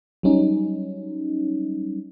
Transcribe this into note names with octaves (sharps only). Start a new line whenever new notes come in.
F#3 G3 C#4 D#4